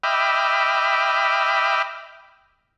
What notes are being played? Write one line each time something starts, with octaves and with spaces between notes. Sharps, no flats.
D#5 E5 G5 B5 D6 F6